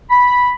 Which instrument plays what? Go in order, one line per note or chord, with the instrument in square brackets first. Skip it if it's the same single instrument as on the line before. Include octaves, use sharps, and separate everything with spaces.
[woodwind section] B5